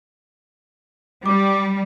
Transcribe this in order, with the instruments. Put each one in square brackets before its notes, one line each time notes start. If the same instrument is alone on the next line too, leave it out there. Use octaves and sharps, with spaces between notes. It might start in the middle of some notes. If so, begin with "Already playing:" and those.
[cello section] G3 [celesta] D6